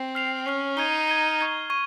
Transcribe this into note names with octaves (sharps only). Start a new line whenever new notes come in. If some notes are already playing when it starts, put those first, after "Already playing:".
Already playing: C4
F6 C7 F7
C#4 F6 C7 F7
D#4 G#6 D#7 G7
G#6 D#7 G7
C#6 G#6 D#7
C#6 G#6 D#7